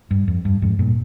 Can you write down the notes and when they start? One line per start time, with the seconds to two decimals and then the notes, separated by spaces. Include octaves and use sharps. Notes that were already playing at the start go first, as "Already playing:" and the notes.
0.11 G2
0.28 F2
0.45 G2
0.62 F2 G#2
0.79 G2 A#2